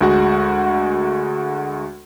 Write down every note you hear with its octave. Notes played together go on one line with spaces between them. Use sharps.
D2 G#3 F#4 F#5